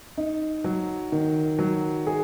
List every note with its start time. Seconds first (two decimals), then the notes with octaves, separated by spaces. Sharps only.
0.17 D#4
0.64 F#3
1.12 D#3
1.59 F#3
2.07 G#4